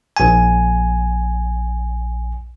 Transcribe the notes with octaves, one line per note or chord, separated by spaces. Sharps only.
A#1 G#5